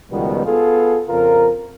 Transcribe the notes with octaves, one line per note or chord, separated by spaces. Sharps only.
C#2 B2 D#3 F3 G3 B3
B3 F4 G#4 A4
F2 C#3 F4 A#4